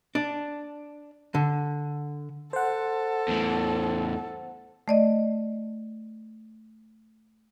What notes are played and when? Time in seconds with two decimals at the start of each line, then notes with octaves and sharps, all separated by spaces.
0.15 D4
1.35 D3
2.53 A4 C5 F#5
3.28 E2 A2
4.88 A3 D5 D#5